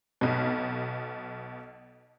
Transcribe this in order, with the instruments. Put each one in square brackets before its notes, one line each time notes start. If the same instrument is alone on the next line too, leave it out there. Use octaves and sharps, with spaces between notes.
[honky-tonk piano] B1 B2